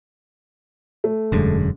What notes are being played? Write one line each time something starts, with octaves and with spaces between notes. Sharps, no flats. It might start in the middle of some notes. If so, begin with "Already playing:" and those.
A3
E1 F#2 D3 G#3